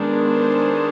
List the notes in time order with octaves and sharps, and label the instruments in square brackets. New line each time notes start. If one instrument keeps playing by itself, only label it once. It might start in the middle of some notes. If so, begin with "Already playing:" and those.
Already playing: [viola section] D#3 G#3 B3 D4
C5